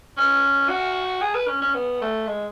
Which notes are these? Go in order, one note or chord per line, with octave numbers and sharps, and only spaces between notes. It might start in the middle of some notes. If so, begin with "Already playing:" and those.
C#4
F#4
G#4
B4
C#4
C#4
B3
A3
G#3